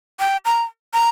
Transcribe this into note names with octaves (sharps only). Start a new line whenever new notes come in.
G5
A#5
A#5